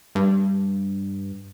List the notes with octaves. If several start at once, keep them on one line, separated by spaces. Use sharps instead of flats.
G2